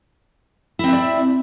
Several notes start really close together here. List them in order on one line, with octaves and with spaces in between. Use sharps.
E4 C4 E5 D5